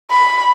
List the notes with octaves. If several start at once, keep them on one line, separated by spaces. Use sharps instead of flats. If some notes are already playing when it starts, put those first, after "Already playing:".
B5